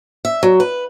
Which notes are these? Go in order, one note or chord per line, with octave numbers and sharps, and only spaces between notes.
E5
F#3
B4